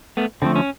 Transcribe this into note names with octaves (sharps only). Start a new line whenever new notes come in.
A3 B3
D3 F3 A3 C4
C#4